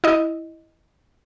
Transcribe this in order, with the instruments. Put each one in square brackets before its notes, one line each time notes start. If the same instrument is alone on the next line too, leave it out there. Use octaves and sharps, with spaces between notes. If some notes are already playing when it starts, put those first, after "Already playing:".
[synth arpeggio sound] E4 D#5